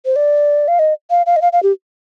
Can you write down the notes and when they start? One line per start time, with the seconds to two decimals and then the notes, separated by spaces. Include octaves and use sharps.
0.06 C5
0.16 D5
0.68 F5
0.79 D#5
1.10 F5
1.26 F5
1.36 D#5
1.42 F5
1.53 F5
1.63 G4